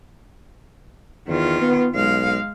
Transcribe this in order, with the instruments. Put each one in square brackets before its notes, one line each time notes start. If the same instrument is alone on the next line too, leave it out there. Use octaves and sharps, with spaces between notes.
[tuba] E2 [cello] D#3 F4
[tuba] B3
[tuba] B1 [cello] G#3 F5